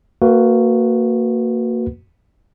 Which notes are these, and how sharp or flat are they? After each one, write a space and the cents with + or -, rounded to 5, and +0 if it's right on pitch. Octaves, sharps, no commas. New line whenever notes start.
A#3 -25 F#4 +0 B4 +0